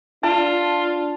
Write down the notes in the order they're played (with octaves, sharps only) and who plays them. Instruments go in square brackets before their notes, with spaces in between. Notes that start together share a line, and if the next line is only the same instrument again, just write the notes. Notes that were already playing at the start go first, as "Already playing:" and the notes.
[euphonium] D4 [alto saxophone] F4 [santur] A5